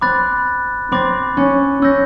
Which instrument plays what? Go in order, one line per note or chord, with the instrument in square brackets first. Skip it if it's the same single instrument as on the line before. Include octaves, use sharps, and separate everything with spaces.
[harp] C4 [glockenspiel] B5 D6 F#6 A6
[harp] C4 [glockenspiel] B5 D6 F#6 A6
[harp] C#4
[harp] C#4 [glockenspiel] E6 G6 A#6